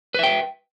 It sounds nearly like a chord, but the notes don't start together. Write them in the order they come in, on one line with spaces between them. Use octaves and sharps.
B4 E5 G5